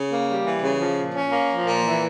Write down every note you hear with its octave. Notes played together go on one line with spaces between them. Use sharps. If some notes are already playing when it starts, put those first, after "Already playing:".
Already playing: C#3
A#3
G3
E3
C#3
F3
A#2
C#4
A#3
F3
A#2
E3